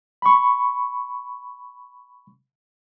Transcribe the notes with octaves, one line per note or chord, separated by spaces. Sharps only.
B5 C#6